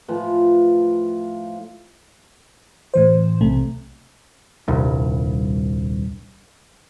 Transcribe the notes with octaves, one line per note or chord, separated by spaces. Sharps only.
A2 F3 B4
A2 E3 C5
B1 C3 A3
D#1 C2 G2